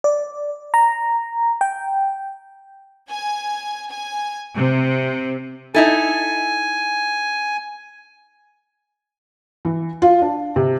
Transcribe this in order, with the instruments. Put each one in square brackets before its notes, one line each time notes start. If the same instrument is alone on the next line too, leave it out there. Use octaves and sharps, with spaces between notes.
[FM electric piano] D5
A#5
G5
[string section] G#5
G#5
C3
[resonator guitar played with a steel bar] D#4 E4 A4 [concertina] G#5
[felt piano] E3
F4
D4
C3